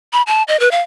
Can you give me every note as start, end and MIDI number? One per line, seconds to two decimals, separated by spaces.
0.13 0.22 83
0.27 0.43 81
0.48 0.59 75
0.60 0.71 71
0.71 0.81 77